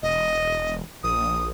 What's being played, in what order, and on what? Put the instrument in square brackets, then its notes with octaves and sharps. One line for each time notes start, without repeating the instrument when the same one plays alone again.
[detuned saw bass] E1 [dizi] D#5
[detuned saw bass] A#1 [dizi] D#6